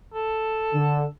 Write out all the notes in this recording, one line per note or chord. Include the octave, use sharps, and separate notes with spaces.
A4
D3